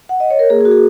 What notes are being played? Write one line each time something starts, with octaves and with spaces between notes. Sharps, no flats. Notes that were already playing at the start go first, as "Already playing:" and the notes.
F#5
D#5
C#5
A#4
A#3 G#4
G#4
F#4
G#4